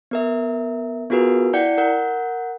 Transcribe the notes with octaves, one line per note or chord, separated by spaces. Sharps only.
B3 A#4 E5
B3 F4 F#4 G#4 A#4 B4
E4 D5 F#5 G5 G6 C#7
A#4 F#5 G6